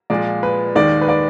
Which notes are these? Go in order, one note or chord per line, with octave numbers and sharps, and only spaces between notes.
A#2 F3 G#3 D5
B4
D#2 D#3 G#3 D5
B4
D5